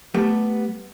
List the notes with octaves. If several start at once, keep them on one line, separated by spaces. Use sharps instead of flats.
G3 A3 B3 G4 A4